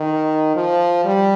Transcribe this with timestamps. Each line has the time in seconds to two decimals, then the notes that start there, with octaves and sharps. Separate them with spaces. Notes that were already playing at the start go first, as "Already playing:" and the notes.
Already playing: D#3
0.55 F3
1.05 G3